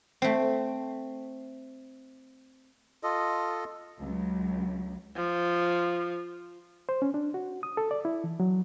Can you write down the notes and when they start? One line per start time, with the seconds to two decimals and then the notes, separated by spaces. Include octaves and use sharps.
0.22 A3 C4
3.03 F4 A4 D#5
4.00 C#2 F#3
5.16 F3
6.89 C5
7.02 C#4
7.14 D4
7.34 F#4
7.63 D#6
7.77 A4
7.91 D5
8.05 E4
8.24 E3
8.40 F#3